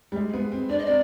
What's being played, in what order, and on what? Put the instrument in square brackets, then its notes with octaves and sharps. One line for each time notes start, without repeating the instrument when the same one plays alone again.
[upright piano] G3
G#3
B3
C4
[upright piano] D4 [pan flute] D5
[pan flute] D#5
[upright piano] C4 [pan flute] D5